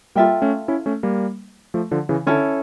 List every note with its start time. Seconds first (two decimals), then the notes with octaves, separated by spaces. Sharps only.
0.15 G3 A#3 F4 A4 E5 G5
0.42 A3 C#4
0.68 C#4 E4
0.86 A3 C#4
1.03 G3 A#3
1.74 F3 A3
1.91 D3 F3
2.09 C#3 E3
2.26 D3 C#4 E4 A4